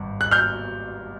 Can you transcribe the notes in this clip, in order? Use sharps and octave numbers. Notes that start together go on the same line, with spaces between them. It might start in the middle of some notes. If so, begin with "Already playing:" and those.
Already playing: G#1 G2
F#6
F6 G6